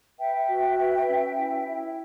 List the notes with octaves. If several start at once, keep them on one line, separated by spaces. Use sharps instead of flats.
B4 E5 G5
F#4
B4
C#4
E4
E4